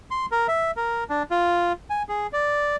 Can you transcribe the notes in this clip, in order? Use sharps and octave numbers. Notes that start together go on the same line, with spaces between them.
C6
A#4
E5
A#4
D4
F4
G#5
G#4
D5